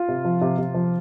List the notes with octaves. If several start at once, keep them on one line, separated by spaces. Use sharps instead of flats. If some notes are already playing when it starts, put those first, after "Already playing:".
Already playing: F4
C3
F3
C3
C3
F3